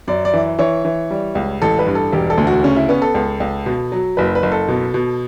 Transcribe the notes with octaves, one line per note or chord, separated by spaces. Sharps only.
F#2 D5
D5
E3
E3 C#5
E3
G3
C#2
A1 A4
B4
G2
A4
E1 G4
A4
D2
F#4
C#3 C#4
E4
B3 C#4
A4
C#2
C#2
B2
F#3
F#1 B4
B4
F#1
A4
B2
B2